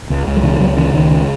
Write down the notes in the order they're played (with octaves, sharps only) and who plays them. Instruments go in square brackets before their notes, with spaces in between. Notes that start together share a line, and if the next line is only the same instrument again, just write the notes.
[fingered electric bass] C#2
C#2
F#3
C#3 E3
E3
C#2 F#3
C#3 E3
C#2 D#3
C#3